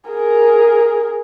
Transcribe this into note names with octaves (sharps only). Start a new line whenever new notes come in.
G#4 A#4